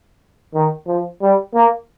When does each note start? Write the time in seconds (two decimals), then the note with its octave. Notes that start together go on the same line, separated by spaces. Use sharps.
0.54 D#3
0.87 F3
1.21 G3
1.54 A#3